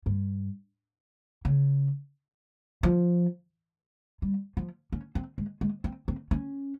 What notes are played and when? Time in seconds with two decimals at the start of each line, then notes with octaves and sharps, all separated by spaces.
0.06 G2
1.45 C#3
2.83 F3
4.22 G3
4.57 F3
4.92 C#4
5.15 C4
5.38 G#3
5.61 G#3
5.84 C4
6.08 C4
6.31 C#4